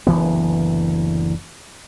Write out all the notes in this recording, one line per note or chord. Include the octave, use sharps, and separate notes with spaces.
F#1 D2 E3 B3